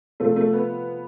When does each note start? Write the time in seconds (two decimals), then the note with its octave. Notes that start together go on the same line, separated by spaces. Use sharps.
0.20 C3 F3 A3 C4 F4 A4
0.36 A3
0.53 B3